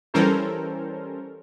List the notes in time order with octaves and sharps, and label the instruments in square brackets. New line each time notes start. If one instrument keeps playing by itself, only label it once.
[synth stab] E3 G3 C#4 A4 A#4 C5